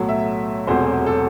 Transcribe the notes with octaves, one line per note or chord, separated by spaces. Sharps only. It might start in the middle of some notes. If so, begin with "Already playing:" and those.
Already playing: B1 A2 F#3 A3
E5
E1 E2 C3 F#3 A3 C5
A4